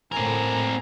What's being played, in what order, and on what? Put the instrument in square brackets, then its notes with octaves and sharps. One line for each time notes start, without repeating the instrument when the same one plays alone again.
[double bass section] A2 [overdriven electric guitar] C4 A#4 [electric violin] G#5 A#5